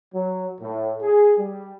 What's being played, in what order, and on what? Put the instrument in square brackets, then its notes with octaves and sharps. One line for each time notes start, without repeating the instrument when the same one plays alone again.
[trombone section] F#3
A2
G#4
G3